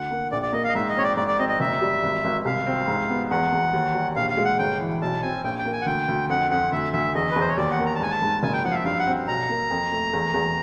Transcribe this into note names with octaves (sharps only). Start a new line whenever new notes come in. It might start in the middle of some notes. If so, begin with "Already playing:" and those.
Already playing: D2 F#5
A#3
A#1 D5
D5
A#3 D#5
F5
D#5
G#2 E5
D#5
C4 C#5
D5
G#2 D5
D5
C4 D#5
D#5
F#1 E5
G3
G#1
G#1
C2 F5
C4
G#2
B3
E2 F#5
E2
D#2
G3
A#1 F5
F5
G#3
F#5
G1 G5
E3
B1 A5
C4 G#5
A#1 G5
G5
A#3
G#5
F#5
D2 G5
D2
F2 F#5
F2 F#5
D2 E5
D2 E5
E2 D#5
B4
E2 C5
C#5
D#2 D5
F#5
A#3
A#5
A5
G#2 G#5
A5
G#2
F#1 G#5
G5
F3 F#5
F5
E5
G2 F5
F#5
C4
B1 A#5
A#3
F2
A3
E2
E2